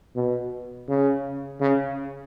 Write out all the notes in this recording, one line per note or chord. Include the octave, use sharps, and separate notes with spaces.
B2
C#3
C#3